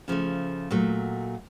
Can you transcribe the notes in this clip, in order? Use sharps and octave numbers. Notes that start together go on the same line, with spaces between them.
C#3 F3 A3
A#2 F#3 A3